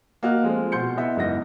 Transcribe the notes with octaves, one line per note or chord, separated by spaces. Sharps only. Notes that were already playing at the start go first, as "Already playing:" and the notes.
A#3 F#4 D#5 F6 F#6
F3 G#3 A3 C4
B2 C6 G6 C#7
B3 E4 D#5 E5
F#1 G#2 B3 E4 D#5 A#6